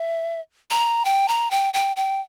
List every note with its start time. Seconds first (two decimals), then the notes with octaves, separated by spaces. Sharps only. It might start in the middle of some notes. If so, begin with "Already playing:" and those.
Already playing: E5
0.71 A#5
1.05 G5
1.28 A#5
1.51 G5
1.73 G5
1.96 G5